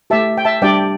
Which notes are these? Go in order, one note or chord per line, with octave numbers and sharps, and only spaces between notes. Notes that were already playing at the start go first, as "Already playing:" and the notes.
A3 G4 E5 A5
G5
E5 A5
G3 D4 G4 D5 G5